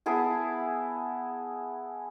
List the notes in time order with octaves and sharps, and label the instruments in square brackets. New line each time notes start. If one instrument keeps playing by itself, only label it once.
[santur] B3 E4 G#4 A5